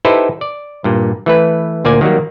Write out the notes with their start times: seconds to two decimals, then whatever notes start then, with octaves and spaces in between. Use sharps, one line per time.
0.05 D#4 E4 G4 A4 B4 C5
0.41 D5
0.84 G2 A#2
1.26 E3 A3 B4
1.85 D2 A#2 A#3 D5 G#5
2.01 D#3 F#3 G3 A#3